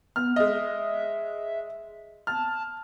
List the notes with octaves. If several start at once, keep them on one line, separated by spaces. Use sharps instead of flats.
B3 F6
G#3 D#5 E5
A5 F6